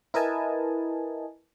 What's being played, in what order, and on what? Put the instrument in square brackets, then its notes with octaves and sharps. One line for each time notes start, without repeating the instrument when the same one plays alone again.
[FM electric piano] E4 A#4 B4 D#5 G#5 A5